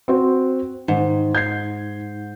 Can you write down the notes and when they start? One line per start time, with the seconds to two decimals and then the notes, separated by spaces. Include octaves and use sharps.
0.08 C4 F#4 C5
0.88 G#2 D#3
1.35 G6 G#6 C7